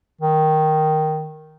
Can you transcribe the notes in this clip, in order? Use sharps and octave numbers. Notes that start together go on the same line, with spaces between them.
D#3